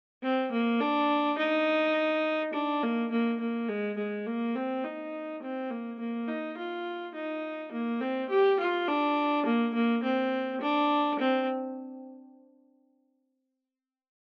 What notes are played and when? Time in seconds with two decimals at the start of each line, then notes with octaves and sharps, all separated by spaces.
0.23 C4
0.52 A#3
0.80 D4
1.38 D#4
2.53 D4
2.83 A#3
3.11 A#3
3.40 A#3
3.69 G#3
3.97 G#3
4.26 A#3
4.55 C4
4.84 D#4
5.42 C4
5.70 A#3
5.99 A#3
6.28 D#4
6.57 F4
7.14 D#4
7.72 A#3
8.01 C4
8.29 G4
8.59 F4
8.87 D4
9.46 A#3
9.74 A#3
10.03 C4
10.61 D4
11.19 C4